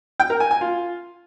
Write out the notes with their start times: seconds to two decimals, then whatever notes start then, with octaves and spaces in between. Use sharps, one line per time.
0.20 G5
0.30 A#4
0.40 G#5
0.51 G#5
0.61 F4